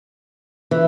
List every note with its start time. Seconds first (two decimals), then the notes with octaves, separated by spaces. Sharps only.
0.71 E3